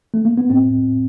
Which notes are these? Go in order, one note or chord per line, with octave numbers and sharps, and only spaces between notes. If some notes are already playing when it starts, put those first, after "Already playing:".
A3
A#3
B3
A2 C4